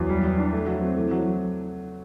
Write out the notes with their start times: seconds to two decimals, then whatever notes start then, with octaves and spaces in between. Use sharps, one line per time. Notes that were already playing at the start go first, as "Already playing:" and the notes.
Already playing: E2 F#3
0.09 G3
0.24 E3
0.38 D4
0.53 A3
0.67 F#3
0.81 C4
0.96 E3 A3
1.11 F#3